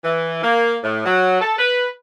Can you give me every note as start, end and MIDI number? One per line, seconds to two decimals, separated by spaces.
0.04 0.40 52
0.43 0.76 58
0.84 1.01 45
1.06 1.39 54
1.41 1.54 69
1.58 1.88 71